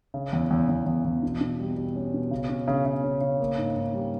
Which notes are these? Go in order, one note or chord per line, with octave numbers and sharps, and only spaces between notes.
C#3
E2
E2
E2
E2
E2
B2
B2
G3
G3
C#4
B2
C#3
C#4
C#3
C#3
C#4
C#3
A#3
G#2
G#2
G3